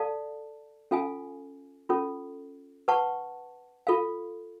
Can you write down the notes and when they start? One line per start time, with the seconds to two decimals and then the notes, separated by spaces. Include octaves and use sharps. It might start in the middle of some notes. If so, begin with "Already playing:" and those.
Already playing: A4 D5 F5 A5
0.91 C#4 F4 A4 F5 G#5
1.89 C#4 F4 A4
2.88 B4 F#5 A5 C#6
3.87 F4 A4 F5